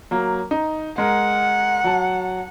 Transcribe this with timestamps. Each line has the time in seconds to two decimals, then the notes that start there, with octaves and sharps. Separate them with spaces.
0.11 F#3 A#3
0.51 D#4
0.98 G#3 A#4 F#5
1.84 F#3 A5